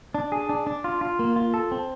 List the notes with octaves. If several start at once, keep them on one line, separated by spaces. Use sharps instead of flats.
D4
G#4
D4
D4
F4
F4
A#3
F4
A4
C4